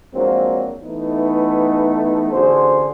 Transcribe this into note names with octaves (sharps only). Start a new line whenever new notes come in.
F3 F#3 G#3 A#3 C4 D4
E3 A3 B3 D#4
A1 D3 F#4 G#4 C5